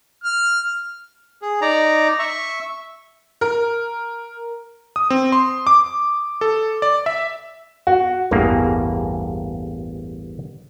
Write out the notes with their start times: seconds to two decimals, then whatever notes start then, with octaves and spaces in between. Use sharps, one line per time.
0.24 F6
1.42 G#4
1.61 D#4 D5 A#5
2.19 E5 C#6
3.41 A#4
4.96 D#6
5.10 C4
5.32 C6
5.67 D6
6.41 A4
6.82 D5
7.06 E5
7.87 F#4
8.31 A1 E2 G2 A#3 G#4